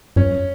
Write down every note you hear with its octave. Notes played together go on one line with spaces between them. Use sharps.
F#2 C#4